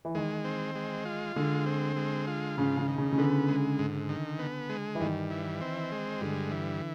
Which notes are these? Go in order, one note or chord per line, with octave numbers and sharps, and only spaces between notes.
E3
D#3 G#3
C4
G#3
F4
D3 G#3
C4
G#3
F4
G#2 C#3
C#3
D#3
C#3
C#3
D3 B3
G#3
G#2
D#3
B3
G#3
E3
G2 D#3
E3
C4
G#3
G2 D3
E3